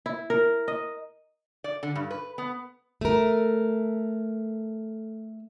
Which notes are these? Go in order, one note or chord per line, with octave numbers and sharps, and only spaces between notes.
E4
A#4
D#5
D5
D3
G2
B4
B3
A3 A#4